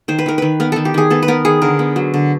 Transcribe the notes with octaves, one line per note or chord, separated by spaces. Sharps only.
D#3 C5
B4
D#3 A#4
D#3 B4
B3 A#4
D#3 A4
G4
D#3 G#4
B3 A4
B4
B3 A#4
D#3 G#4
D3 A#4
B3
F#3
D3